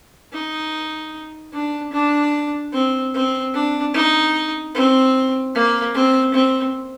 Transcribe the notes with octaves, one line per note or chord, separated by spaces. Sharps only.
D#4
D4
D4
C4
C4
D4
D#4
C4
A#3
C4
C4